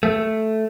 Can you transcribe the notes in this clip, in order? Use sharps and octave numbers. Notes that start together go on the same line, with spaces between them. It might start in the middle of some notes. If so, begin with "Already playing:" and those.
A3